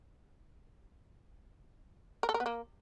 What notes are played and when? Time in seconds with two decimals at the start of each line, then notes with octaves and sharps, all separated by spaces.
2.23 A#4
2.29 A4
2.34 A#4
2.40 B3
2.46 A#3